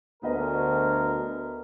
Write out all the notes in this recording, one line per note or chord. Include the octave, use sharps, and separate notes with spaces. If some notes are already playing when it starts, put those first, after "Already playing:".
D2 B3 A#4 B4 D#5